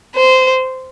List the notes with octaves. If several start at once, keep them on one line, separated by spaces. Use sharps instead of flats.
C5